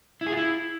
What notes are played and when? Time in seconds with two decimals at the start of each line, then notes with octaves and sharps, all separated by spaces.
0.21 E4
0.27 G#4
0.32 F4
0.37 E4